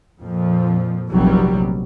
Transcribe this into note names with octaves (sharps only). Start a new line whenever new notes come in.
F2 A#2 F3
F1 A#1 C3 F#3 G3